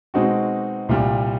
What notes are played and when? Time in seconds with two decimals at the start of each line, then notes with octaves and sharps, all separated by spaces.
0.14 B2 G#3 C4 D#4 F#4
0.89 C2 A#2 G3